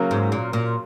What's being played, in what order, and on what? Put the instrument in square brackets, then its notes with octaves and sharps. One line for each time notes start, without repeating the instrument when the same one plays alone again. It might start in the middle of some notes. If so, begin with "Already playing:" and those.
Already playing: [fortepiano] C#3 F#3 A#3
[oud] G#2
A#2
A#2